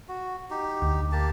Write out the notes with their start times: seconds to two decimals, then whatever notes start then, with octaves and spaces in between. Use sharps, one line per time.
0.09 F#4
0.50 D#4 G4
0.82 D2
1.12 A#3 G4 A5